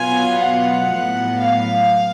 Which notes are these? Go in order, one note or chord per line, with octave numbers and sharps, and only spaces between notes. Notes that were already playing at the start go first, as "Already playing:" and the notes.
Already playing: B2 F#3 B3 F4 G#5
F#5
A2 F#3 B3
F5